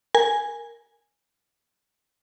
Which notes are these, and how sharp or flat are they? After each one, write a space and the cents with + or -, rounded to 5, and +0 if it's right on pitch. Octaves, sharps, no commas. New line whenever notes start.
A#4 +0 G#5 -5